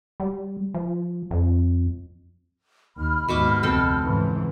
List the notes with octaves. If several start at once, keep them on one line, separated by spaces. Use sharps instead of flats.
G3
F3
F2
D#2 B5 F6
D#2 G#2 B2 E5 D6
F1 D2 C4 A4
G#2 C#3 E3